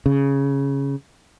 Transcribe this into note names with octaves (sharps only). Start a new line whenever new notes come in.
C#3